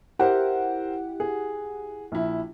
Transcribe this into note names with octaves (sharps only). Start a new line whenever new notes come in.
E4 G4 A#4 C5 E5 F#5
G#4
A#1 E4